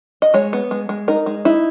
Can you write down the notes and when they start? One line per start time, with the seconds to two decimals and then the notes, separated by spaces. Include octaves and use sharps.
0.22 D#5
0.34 G#3 C#5
0.53 B3
0.71 G#3
0.89 G#3
1.08 D#4 A#4
1.26 G#3
1.45 D#4 E4